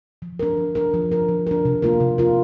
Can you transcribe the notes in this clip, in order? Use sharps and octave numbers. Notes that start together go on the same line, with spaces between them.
F3
D4 A#4
F3
D4 A#4
F3
D4 A#4
F3
D4 A#4
C3
A#3 F4 A#4
C3
A#3 F4 A#4